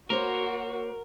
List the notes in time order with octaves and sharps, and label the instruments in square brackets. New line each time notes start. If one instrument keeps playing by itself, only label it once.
[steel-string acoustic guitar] A#3 C5 C#5 [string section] F#4 [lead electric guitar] A#4